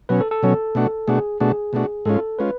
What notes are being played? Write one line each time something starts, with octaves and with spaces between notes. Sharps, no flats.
B2 F#3 C#4 B4
A4
A4
B2 F#3 C#4
B2 A3 D4 F#4
B2 A3 D4 F#4 G#4
B2 A3 D4 F#4 G#4
B2 A3 D4 F#4
G#2 G#3 C#4 F4 A4
G#3 C#4 F4 B4